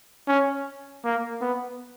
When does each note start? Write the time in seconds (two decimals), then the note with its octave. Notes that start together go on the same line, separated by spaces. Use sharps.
0.28 C#4
1.04 A#3
1.41 B3